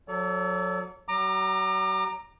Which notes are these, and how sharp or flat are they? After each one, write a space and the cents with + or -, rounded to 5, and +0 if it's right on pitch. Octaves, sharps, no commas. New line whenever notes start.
F#3 -30 A4 +0 D5 -45
F#3 +40 A#5 +0 D6 +35